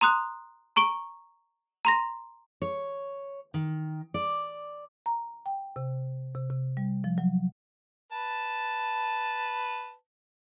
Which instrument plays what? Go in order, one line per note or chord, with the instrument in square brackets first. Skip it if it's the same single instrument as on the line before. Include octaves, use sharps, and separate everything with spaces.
[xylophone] A#5 C6 D#6 F#6
A#5 C#6 D7 G7
A#5 C6 A#6
[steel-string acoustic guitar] C#5
D#3
D5
[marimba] A#5
G5
C3
C3
C3
G3
F3
F#3
[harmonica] B4 A5